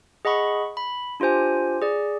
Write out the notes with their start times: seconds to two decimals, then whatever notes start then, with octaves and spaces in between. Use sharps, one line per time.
0.25 G#4 D#5 F#5 B5 C#6
0.77 B5
1.20 D4 F4 G4 C5 G#5
1.82 G#4 D5